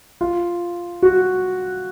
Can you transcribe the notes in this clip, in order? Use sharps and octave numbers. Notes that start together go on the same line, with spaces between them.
F4
F#4